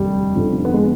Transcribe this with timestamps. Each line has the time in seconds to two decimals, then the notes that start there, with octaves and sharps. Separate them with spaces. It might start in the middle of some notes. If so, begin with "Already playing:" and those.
Already playing: F1 D#2 D3 G3
0.35 F1 F2 D3 F3
0.65 B3
0.74 G#3